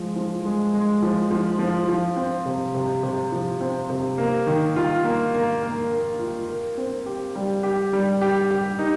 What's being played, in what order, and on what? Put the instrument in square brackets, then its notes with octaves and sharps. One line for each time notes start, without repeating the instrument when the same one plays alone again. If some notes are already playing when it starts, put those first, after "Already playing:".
Already playing: [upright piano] F3 G#3
F3
G#3
G#3
F3
F3
F3
F3
C4
C3
C3
C3
F3
C4
C3
A#3
D#3
F4
A#3
A#3
A#3
A#3
F4
A#4
C4
G4
G3
G4
G3
G4
G4
D#4